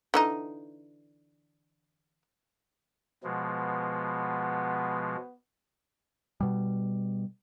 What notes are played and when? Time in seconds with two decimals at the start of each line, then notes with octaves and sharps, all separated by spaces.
0.14 D3 E3 D#4
3.24 B2 F3 G#3 B3
6.41 B2 G3